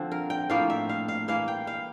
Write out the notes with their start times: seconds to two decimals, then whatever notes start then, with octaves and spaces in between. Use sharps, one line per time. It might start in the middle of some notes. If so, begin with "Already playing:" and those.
Already playing: D3 F3 C4
0.12 A#4
0.30 G5
0.50 A2 F3 A#3 F5
0.70 E5
0.89 F5
1.08 F5
1.28 E3 A#3 F5
1.48 G5
1.67 F5